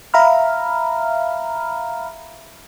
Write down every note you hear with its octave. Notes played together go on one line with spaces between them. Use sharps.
E5 F5 A#5 B5 F6